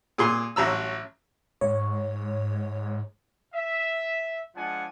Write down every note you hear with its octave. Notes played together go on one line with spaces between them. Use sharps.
A#2 G#4 C6
A1 F#3 A#5 E6
G#2 C#5
E5
F3 G#3 D4 F4 F#5 G#5